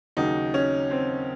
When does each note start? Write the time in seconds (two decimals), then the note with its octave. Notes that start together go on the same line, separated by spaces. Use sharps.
0.17 D#2 C#3 F#3 D#4
0.54 C#4
0.91 C4